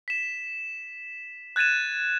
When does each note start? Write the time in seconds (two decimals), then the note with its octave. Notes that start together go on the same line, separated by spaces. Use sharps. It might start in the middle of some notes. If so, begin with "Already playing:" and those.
0.08 B6 E7
1.56 F#6 G#6 A6 D#7 E7